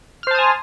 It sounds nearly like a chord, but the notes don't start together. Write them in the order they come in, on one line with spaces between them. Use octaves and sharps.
F6 C5 A5 D#6 G#5